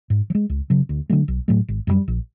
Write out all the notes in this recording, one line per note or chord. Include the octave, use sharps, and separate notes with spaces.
G#2
F3
G#3
C#2
C#3 F#3
D2
D3 F#3 A3
B1
A2 F#3 A3
G#1
F#2 D3 G3
A#1